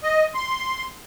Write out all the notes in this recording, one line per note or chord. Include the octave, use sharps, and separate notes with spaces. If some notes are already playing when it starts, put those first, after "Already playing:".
D#5
C6